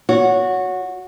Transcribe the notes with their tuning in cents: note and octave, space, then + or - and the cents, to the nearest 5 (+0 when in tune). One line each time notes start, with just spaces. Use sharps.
F#4 -15 C#5 +20